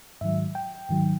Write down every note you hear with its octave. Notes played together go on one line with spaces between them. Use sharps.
G#2 D#3 F#3 E5
G5
G#2 D#3 F#3